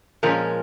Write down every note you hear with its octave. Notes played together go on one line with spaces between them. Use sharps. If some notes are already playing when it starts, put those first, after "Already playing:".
A#2 F3 G#3 C#4 A#4